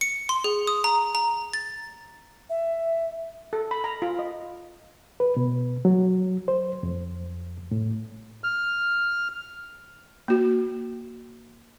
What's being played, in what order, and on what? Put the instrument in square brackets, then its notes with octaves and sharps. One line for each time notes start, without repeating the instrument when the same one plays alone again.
[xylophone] C#7
C6
G#4
D#6
A#5
A#5
A6
[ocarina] E5
[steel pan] A4
B5
A#5
F4
D#5
[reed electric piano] B4
B2
F#3
C5
F2
A2
[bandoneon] F6
[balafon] A#3 F#4